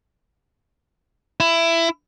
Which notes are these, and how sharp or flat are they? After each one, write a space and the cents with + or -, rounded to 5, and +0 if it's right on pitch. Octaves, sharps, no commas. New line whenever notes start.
E4 +15